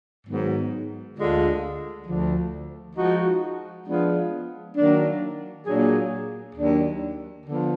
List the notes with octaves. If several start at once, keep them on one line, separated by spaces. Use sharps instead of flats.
G#2 D#3 F#3 B3
D2 D3 G#3 D4 F4
D2 D3 F3
F3 G#3 D#4 F#4
F3 G#3 B3 D4 F4
D#3 F#3 A#3 D4
A#2 F#3 A#3 D4 G#4
D#2 D#3 F#3 D4
D3 F3 B3